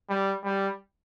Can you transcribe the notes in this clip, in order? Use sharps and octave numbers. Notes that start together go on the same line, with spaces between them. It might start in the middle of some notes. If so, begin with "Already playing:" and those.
G3
G3